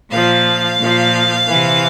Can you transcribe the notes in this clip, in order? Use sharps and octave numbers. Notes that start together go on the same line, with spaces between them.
A#2 F3 F5
A#2 F3
C3 E3